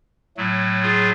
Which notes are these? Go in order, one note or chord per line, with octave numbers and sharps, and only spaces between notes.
A2 F#3 A3
F4 G#4